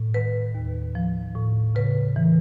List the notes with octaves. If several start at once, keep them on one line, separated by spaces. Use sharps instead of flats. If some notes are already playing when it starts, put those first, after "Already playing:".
Already playing: A2
D#3 B4
D#2
F3
A2
C#3 B4
E3